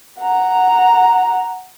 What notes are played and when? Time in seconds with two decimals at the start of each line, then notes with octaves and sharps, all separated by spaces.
0.20 F#5 A#5